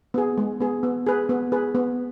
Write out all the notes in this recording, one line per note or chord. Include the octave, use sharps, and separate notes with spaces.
B3 G#4
G#3
B3 G#4
B3
G#4 B4
B3
G#4 B4
B3